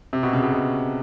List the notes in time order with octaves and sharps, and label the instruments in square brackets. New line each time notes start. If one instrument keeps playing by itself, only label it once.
[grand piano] C3
B2
C#3
B2
B2